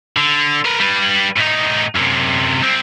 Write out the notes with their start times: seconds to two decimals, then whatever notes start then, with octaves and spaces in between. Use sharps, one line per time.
0.17 D3
0.65 A#4 B4
0.80 G3 B4
1.36 A2 D#4
1.95 F#2 C3
2.61 C2 C4